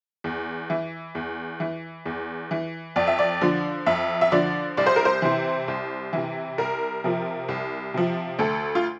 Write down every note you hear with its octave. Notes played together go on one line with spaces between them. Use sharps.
E2
E3
E2
E3
E2
E3
F2 D5
E5
D5
D3 F3
F2 E5
E5
D3 F3 D5
C2 D5
C5
A#4
C5
C3 E3
C2
C3 E3
C2 A#4
C3 F3
C2
C3 F3
D2 A4
F4